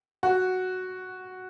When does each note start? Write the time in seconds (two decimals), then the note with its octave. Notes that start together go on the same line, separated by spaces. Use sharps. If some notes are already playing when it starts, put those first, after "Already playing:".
0.23 F#4